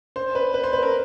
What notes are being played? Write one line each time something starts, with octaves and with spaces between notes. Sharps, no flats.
C5
B4
B4
C5
B4
A#4